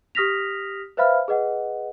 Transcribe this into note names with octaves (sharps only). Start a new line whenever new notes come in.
G4 D#6 F6 A#6 B6 F7
B4 C5 E5 F5 B5 F6
G#4 B4 D#5 F#5